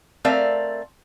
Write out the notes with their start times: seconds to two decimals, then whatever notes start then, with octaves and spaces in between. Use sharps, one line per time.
0.25 A3 C4 A#4 D5 E5 F5